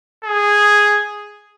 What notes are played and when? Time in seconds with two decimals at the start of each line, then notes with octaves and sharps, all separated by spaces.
0.25 G#4